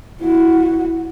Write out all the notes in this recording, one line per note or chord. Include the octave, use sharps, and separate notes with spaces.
E4 F#4